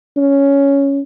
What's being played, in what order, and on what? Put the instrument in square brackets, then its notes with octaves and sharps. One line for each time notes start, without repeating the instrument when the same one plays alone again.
[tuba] C#4